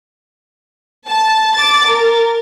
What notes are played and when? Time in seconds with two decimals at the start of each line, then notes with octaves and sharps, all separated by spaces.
1.08 A5
1.55 D6 A6
1.86 A#4